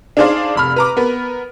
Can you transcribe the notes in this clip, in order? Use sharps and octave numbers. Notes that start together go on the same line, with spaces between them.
D4 D#4 G#4 C5 D5 F5
F1 B5 F6
B4 A#5 D6
B3 A#4 B4